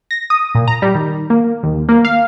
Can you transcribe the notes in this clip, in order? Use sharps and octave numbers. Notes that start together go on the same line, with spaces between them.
A#6
D#6
A#2
A#5
G3
D#3
A#3
D#2
A#3
F5